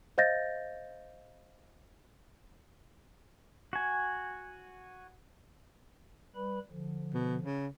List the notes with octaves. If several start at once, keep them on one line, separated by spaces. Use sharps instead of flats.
C5 D#5 F5 G6 A6 A#6
F#4 G#5
G3 B4 B5
D3 F3
B2
C#3